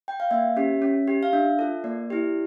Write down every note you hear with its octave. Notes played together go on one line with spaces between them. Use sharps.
G5
F5
A#3 E5
C#4 G4
C#4
G4
F5
D4 E5
F4 A4
A#3 D5
E4 G4